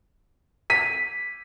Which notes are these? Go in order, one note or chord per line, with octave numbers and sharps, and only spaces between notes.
B6 D#7